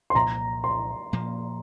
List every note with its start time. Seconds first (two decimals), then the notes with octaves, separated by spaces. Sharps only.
0.10 C6
0.15 C2 A#2 F3 A#5
0.64 C6
1.13 A#2 F3 A#3